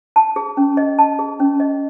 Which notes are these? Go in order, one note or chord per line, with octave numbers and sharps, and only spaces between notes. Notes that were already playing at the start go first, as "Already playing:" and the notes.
A5
G#4
C#4
D#5
A5
G#4
C#4
D#5